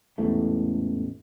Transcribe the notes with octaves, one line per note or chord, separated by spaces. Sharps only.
A1 E2 G#2 A3